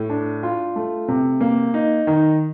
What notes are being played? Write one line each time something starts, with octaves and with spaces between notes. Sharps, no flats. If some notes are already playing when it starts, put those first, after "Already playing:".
Already playing: A2
D4
F4
A3
C3
A#3
D#4
D#3